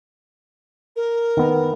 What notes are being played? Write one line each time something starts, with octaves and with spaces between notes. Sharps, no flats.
A#4
D#3 B3